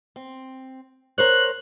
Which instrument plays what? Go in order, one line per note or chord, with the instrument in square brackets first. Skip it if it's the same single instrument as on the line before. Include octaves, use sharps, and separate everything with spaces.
[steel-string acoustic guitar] C4
[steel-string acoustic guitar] A#4 C5 C#5 [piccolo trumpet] F#6